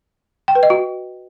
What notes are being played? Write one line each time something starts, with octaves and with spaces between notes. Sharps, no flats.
G5
B4
D#5
F#4